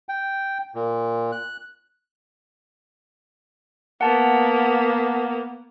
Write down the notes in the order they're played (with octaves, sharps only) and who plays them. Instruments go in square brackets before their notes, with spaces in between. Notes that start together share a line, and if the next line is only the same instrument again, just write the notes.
[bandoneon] G5
A#2
F#6
[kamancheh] A#3 B3 [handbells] F#5 A5